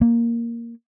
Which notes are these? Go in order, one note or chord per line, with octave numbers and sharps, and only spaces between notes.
A#3